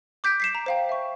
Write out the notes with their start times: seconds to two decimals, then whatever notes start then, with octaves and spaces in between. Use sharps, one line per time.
0.24 D6 G6 B6 D7
0.40 B6 C7 E7
0.55 A#5
0.66 C5 F5 G5
0.89 E5 C#6